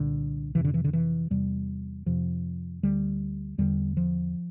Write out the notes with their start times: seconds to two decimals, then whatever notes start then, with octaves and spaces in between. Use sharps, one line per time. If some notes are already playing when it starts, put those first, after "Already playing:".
Already playing: C2 A#2 D3
0.55 F2 C3 E3
0.65 D3
0.74 E3
0.84 D3
0.93 E3
1.30 E2 C3 G3
2.06 F2 C3 F3
2.83 D2 D3 G3
3.58 E2 D3 G3
3.97 F3